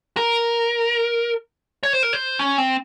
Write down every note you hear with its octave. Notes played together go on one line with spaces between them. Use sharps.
A#4
C#5
C5
A#4
C5
C#4
C4